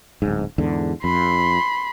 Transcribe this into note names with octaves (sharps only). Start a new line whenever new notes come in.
D1 G#2
E2 G#2 D3
F2 B5 C6